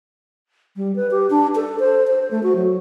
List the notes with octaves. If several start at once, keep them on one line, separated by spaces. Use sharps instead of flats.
G3
B4
G4
D4
A4
C5
C5
A3
F#4
F#3